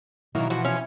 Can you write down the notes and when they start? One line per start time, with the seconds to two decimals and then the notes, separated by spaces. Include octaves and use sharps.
0.35 B2 D#3 F#3 A#3 E4
0.50 E3 F3 F#4
0.65 C#4